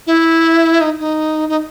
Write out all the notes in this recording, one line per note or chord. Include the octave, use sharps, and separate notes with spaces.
E4
D#4
D#4
D#4